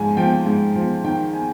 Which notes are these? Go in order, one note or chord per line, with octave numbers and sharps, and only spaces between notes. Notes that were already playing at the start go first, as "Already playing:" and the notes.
Already playing: G#2 F3 G#5
F3 G5
G#2
F3
D#3 G5
G#5